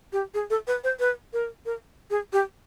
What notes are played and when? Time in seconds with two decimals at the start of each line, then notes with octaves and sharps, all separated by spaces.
0.13 G4
0.34 G#4
0.50 A4
0.67 B4
0.84 C5
0.99 B4
1.33 A#4
1.66 A#4
2.10 G#4
2.33 G4